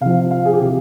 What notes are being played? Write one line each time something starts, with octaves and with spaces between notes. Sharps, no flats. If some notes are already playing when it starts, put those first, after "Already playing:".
C3 F3 F5
F5
G#4
G4
C3 E3 G#4